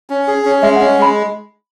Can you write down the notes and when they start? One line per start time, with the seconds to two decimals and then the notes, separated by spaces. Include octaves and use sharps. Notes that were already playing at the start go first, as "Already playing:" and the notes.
0.10 C#4
0.28 G#4
0.45 C#4
0.63 G#3 E5
0.76 C#4 F#5
0.98 G#3 B5